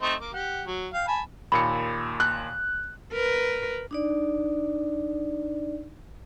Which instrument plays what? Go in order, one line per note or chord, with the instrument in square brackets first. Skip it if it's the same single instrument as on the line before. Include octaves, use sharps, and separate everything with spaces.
[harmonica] A3 C4 D#4
A#3 D6
G4 F#5
F#3
F5 G5
G#5 A5 B5
[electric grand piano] D#2 A#2 C#7 [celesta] B5
[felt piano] F#6
[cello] A#4 B4
[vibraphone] D4 D#4 D5